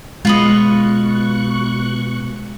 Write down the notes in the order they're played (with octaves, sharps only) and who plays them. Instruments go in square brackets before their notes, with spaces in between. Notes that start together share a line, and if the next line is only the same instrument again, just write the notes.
[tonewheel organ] B2 C#6 F#6 [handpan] G#3 [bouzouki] F4 B4 D#5